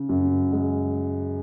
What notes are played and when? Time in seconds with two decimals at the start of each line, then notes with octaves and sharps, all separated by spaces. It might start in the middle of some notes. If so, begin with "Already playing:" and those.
Already playing: C#3
0.09 F#2
0.52 G#3